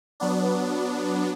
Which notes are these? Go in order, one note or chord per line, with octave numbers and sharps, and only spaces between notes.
F#3 B3 D4